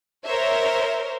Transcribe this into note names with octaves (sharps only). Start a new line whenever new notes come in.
A#4 C5 C#5 E5